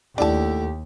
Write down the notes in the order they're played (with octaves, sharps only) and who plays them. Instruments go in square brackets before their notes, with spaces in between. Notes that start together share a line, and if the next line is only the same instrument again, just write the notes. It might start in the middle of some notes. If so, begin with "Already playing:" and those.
[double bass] D#2 [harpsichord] A3 E4 F#4 [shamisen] D4 A5 [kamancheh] G4